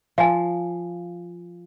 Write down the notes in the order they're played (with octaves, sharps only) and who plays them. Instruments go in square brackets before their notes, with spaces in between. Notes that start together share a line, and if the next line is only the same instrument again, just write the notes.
[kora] F3 [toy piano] F5 G#5